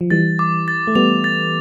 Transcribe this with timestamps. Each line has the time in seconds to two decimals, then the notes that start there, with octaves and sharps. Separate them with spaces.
0.01 F3
0.10 E3 G3 A6
0.39 D6
0.68 A6
0.87 A3
0.95 G3 B3 F7
1.24 A6